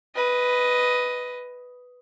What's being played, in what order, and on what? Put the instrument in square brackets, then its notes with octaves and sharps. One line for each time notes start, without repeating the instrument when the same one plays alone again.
[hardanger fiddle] B4 D#5